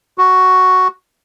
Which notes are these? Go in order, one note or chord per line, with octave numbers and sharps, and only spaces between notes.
F#4